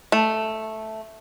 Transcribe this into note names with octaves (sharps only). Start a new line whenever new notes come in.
A3